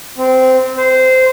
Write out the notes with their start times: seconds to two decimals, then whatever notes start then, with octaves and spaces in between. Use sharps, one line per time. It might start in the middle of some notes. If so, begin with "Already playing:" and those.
0.18 C4
0.77 C5